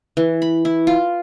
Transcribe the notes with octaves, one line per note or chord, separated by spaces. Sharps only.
E3
B5
E4
F4